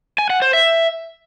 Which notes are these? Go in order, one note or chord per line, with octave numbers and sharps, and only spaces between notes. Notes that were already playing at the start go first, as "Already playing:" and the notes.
G#5
F#5
C5
E5